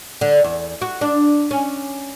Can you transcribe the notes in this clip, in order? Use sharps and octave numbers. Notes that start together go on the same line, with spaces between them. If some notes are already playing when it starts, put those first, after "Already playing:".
D3
E2
F#4
D4
C#4